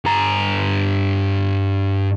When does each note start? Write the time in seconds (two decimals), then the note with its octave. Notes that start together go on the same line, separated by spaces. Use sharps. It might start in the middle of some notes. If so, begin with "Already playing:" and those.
0.05 G2 A#5